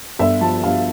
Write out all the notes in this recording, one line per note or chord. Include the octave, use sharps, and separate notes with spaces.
G1 E5
F3 A5
G1 F5